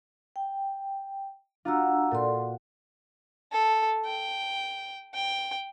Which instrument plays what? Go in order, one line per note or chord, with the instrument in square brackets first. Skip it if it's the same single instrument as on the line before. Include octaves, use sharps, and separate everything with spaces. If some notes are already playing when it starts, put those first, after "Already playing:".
[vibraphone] G5
[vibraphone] D4 A#5 E6 [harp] F4 F#4
[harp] A#2 [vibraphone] A4 D5 C6
[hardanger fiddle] A4
G5
G5